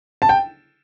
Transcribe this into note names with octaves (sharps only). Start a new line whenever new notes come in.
A5
G5